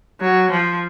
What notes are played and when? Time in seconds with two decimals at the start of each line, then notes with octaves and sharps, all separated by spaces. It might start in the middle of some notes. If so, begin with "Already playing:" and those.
0.21 F#3
0.50 F3